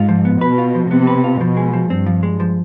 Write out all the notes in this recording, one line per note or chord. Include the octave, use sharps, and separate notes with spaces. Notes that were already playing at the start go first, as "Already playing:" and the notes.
Already playing: G#2 F4
F3
B3
B2 B4
F4
F3
C3 B3
B4
F4
B2 F3
G#3
F3
G2 C4
F3
G#3
F3